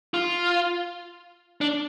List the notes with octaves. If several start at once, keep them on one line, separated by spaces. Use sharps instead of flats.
F4
D4